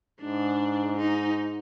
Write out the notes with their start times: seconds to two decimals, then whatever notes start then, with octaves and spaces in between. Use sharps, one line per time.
0.21 G#2 D4
0.97 D#4